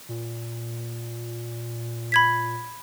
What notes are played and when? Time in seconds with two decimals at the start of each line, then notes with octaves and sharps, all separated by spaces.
0.09 A#2
2.12 B5 G#6 B6